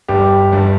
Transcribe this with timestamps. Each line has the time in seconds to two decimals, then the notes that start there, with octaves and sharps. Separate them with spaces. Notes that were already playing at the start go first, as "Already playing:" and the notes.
0.08 G1 G2 G3 G4
0.52 G1 G2 G3